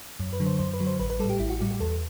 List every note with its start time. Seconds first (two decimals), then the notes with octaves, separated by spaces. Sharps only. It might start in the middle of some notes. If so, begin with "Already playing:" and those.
0.19 F#2
0.33 B4
0.40 D3 F#3
0.46 C5
0.59 F#2 C5
0.73 B4
0.80 D3 F#3
0.87 C5
0.99 A1 B4
1.10 B4
1.20 G3 A4
1.25 A2 G4
1.40 A1 E4
1.50 F#4
1.60 A2 G3 F#4
1.71 G4
1.80 E2 A4